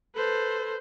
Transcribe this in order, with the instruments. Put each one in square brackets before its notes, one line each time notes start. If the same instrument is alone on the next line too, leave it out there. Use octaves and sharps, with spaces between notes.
[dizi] A4 [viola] B4 C5